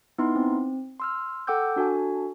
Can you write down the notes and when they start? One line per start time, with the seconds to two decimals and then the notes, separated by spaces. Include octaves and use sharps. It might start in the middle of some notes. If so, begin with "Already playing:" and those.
0.18 B3 D#4 E4 C6
0.35 C4
1.00 C6 E6 F6
1.47 A4 F#5 G5 D6 E6 G6
1.76 D4 F#4 A4 G#5